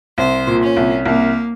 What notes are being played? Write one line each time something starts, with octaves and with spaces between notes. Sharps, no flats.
C2 C5
A#2
C#4
C2
C2 A#3